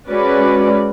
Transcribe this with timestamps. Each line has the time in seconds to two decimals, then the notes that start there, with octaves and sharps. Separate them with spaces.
0.10 G#3 C#4 F#4 B4 D5